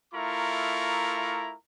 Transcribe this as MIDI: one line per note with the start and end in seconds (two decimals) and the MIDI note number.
0.14 1.54 57
0.14 1.54 64
0.14 1.54 65
0.14 1.54 70
0.14 1.54 82
0.14 1.54 85